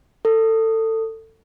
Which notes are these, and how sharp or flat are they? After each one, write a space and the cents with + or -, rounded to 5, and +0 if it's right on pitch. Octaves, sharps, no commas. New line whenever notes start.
A4 +25